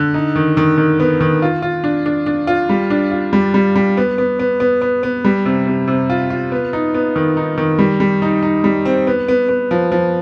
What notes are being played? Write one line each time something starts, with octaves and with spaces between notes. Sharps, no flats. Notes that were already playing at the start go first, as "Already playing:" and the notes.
Already playing: D3
D#4
D#3
D#3
D#3
B3
D#3
F4
F4
D4
D4
D4
F4
G3
D4
F4
G3
G3
G3
B3
B3
B3
B3
B3
B3
G3
C3
C3
C3
F4
F4
B3
D#4
B3
D#3
D#4
D#3
G3
G3
D#4
D#4
G3
C4
B3
B3
B3
F3
F3